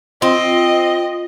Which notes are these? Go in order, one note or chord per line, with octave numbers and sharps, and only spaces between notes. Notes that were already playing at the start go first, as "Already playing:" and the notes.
C4 F4 D#5